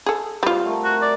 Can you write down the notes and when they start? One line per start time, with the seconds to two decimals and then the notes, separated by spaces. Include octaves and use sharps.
0.06 G#4 A4
0.43 G3 C4 F4 G4 F#5
0.66 A3 A#4
0.84 F#4
1.02 D5